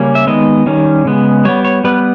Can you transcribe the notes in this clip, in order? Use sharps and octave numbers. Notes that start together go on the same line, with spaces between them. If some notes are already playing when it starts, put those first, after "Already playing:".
Already playing: C#3 G3 A#3 C#4
E5
D#3 G#3 B3 D#5
D#3 G3 C#4
C#3 G#3 B3
G3 B3 C#5
C#5
G3 B3 B4